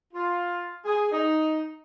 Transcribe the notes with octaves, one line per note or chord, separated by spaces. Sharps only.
F4
G#4
D#4